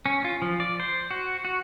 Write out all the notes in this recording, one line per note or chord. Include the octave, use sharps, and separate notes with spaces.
C#4
F4
F3
D5
C5
F#4
F#4